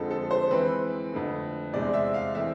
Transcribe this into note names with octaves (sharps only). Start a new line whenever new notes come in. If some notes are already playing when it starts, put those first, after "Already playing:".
Already playing: F2 D3 F3 G#3 C4 A4
A4
C5
E3 G#3 C4 E4 B4
F2 D3 A3
E2 C3 G#3 D5
E5
F5
E3 A3 C4 E5